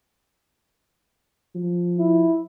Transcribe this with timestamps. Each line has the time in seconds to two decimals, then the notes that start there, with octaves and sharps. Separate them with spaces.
1.55 F3
1.99 E4